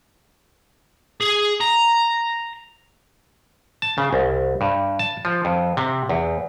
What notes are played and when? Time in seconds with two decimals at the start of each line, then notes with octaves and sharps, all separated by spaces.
1.21 G#4
1.61 A#5
3.82 A5
3.98 C#3
4.13 C2
4.61 G2
4.99 A5
5.25 F3
5.45 F2
5.77 C3
6.09 E2